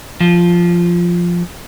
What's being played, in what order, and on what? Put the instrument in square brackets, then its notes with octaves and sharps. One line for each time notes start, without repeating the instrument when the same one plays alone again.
[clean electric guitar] F3 F4